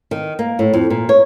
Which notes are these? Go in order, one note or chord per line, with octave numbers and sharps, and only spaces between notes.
D#3
A#3
A2
F2
A#2
C#5